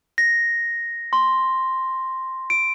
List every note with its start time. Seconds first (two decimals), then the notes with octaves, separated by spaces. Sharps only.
0.18 A#6
1.13 C6
2.50 D7